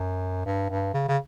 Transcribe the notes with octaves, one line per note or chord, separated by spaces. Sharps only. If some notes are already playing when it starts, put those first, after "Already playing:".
Already playing: F#2
G2
G2
C#3
C#3